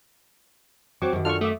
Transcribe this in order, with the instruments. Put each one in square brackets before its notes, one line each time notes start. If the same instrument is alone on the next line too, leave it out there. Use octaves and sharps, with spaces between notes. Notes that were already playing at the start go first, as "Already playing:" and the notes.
[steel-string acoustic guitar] F#3 C4 [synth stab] C#6 D6
[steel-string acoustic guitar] F#2 D#3
[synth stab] D4 F4 A4 [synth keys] C#6 F6
[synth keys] A3 [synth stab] E5 D6 D#6